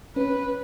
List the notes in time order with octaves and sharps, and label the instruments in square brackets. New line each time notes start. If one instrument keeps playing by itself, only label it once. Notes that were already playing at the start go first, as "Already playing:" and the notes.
[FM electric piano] C#4 [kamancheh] B4